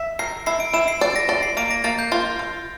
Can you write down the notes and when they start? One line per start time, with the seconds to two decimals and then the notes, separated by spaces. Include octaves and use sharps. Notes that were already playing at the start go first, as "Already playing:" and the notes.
Already playing: E5
0.19 A#4 C7
0.46 E4 C7
0.60 D7
0.73 E4 E7
0.88 C7
1.01 D5 D7
1.16 A#6
1.29 D5
1.43 C7
1.57 A#3 D7
1.71 A#6
1.84 A#3 A6
1.99 G6
2.12 F4 A6
2.39 F4